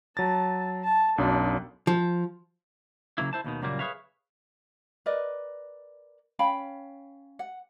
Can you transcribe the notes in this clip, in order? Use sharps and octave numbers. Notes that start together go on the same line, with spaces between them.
F#3 A5 A6
A5
B1 F#2 D4
F3
C#3 F#3 A#3 E4
E4 C5 A5
D#2 B2 D#3
F#2 A#2 C#3 G3 A#3
G#4 B4 C#5 E5 F5
A#4 B4 D5 D#5
C#4 F5 G5 B5
F#5